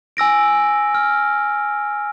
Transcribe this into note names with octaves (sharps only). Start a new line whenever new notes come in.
G#5 E6 A#6 D7
F6